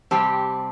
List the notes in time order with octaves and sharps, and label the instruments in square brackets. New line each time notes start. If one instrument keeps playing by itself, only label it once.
[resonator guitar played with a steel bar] C3 G3 C4 G4 [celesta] A5